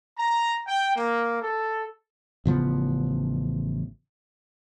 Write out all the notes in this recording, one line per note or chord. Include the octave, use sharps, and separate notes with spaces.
A#5
G5
A#3
A4
A1 C#3 F3 B3